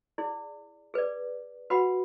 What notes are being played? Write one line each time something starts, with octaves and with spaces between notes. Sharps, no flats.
E4 G#4 D5
G#4 B4 D5
F#4 B4 F#5 B5